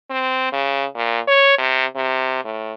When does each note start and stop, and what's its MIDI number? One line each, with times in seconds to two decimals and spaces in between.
0.10 0.49 60
0.52 0.85 49
0.95 1.20 46
1.27 1.56 73
1.58 1.85 48
1.96 2.41 48
2.44 2.73 45